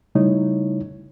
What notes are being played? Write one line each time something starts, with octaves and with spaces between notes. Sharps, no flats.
C#3 G3 A3 D#4 E4 C#5